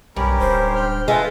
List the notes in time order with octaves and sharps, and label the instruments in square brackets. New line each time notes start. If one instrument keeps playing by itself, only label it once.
[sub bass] B1 [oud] G2 [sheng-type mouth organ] C#4 G4 A#4 [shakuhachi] B5
[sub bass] D1 [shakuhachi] C5
[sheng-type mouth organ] G5 F6
[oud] G#3 [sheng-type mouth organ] F4 A4 E5 [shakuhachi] B4